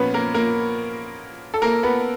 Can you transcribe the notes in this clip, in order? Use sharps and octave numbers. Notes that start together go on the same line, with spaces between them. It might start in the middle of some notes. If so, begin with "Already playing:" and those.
Already playing: A#2 F3 B3 C#4 B4 C#5
A#3 A#4
A#3 A#4
A4
A#3 A#4
B3 B4